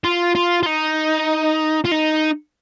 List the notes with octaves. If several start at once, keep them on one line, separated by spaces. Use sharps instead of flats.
F4
F4
F4
D#4
F4
D#4